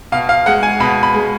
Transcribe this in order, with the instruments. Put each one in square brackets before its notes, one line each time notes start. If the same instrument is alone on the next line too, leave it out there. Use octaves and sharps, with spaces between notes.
[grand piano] B2 F5
F5
G#3 F#5
G#5
B2 B5
B5
G#3